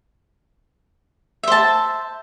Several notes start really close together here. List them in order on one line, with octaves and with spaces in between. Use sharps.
E5 C5 A5